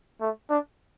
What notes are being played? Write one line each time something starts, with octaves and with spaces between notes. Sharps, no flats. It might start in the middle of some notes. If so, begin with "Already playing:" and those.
A3
D4